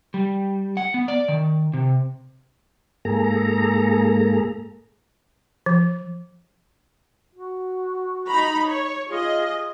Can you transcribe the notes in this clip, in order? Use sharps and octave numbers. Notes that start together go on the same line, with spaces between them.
G3
F#5
B3
D5
D#3
C3
G#2 A#3 G#4 A4 A#5
F3
F#4
D#4 A#5 B5
C#5
F4 G#4 D#5